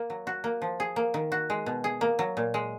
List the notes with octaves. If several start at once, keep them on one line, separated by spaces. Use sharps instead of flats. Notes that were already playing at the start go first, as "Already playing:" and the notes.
Already playing: A#3
F#3
F#4
A#3
F3
G#4
A#3
D#3
F#4
G#3
B2
G#4
A#3
F#3
A#2
G#3